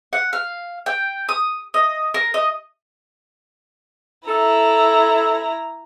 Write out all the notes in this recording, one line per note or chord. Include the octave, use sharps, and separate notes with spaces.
F#5
F5
G5
D#6
D#5
A#4
D#5
E4 A4 A#5